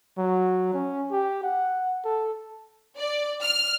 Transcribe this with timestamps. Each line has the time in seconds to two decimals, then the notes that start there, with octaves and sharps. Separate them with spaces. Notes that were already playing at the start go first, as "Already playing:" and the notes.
0.18 F#3
0.74 C#4
1.12 G4
1.43 F#5
2.05 A4
2.98 D5
3.42 F6